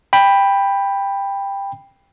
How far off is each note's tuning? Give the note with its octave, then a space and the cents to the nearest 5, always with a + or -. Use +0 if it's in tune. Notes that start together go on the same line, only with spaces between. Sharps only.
G5 +15 B5 +0